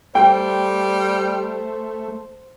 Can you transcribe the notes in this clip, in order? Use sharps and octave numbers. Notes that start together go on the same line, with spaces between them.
G3 A3 C5 G5